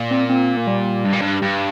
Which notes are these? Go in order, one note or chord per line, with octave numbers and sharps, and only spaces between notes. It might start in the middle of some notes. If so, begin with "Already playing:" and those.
Already playing: A#2
C4
C4
A#3
G3
G2
A#2
G2
G2